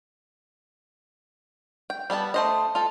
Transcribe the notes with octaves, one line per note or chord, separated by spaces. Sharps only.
G5
G3 B3 G#5 A5
A3 C5 D#5
F4 A4